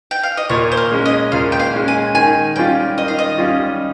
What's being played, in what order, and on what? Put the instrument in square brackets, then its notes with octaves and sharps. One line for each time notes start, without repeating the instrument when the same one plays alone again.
[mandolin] G5
F5
D#5
[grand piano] A#2 [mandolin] C#5
[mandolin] C5
A#4
[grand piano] G#3 C#4
[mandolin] D#5
[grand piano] A#2 [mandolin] F5
[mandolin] G5
F5
[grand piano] G#3 C#4
[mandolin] G#5
[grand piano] D#3 [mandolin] G#5
[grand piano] G3 C#4 F4 [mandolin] G5
[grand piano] D#3 [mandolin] D#5
[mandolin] F5
D#5
[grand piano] G3 C#4 F4